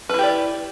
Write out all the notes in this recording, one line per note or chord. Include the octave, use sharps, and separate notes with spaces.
E4 G4 B4 D5